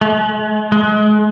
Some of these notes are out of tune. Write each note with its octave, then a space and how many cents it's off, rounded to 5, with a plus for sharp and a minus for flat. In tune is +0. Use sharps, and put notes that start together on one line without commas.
G#3 +45
G#3 +35